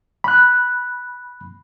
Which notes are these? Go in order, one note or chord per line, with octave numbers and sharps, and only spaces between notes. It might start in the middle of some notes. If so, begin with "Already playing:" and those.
B5 F#6